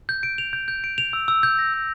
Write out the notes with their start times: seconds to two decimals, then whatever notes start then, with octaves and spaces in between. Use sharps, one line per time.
0.09 G6
0.23 D7
0.38 F7
0.53 G6
0.68 G6
0.84 D7
0.98 F7
1.13 E6
1.28 E6
1.43 G6
1.59 A#6
1.74 E6